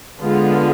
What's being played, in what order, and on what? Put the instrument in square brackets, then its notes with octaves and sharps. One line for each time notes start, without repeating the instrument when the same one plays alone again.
[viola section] D3 G#3 B3 F4